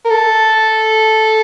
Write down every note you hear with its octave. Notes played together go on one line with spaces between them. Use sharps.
A#4
A4